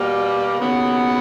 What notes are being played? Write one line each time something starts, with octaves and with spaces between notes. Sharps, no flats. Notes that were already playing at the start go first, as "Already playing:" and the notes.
Already playing: B2 G3 A#3
D#2 C#3 F#3 B3